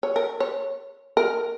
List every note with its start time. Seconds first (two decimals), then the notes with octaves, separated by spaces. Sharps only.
0.03 C#5
0.16 A#4
0.40 C#5
1.17 A#4